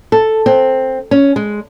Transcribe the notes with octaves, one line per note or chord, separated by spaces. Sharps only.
A4
C4
C#4
G#3